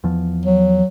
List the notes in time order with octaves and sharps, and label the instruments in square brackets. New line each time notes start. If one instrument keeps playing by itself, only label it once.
[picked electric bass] E2 F3
[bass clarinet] F#3